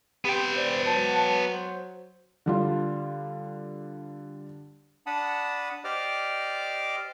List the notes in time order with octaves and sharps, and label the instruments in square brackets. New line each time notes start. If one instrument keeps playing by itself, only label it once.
[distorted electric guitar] B3 G5 [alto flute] C4 [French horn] G4
[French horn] C5 [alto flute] D5
[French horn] F#3 [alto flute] A5
[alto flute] C5
[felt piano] D3 G3 F4
[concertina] D4 F#5 A5 B5 D#6
G4 C5 D5 D#5 D6 F6